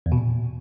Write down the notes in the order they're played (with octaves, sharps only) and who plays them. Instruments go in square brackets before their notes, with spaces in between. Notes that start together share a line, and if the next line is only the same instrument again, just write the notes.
[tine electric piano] E2
B2
A#2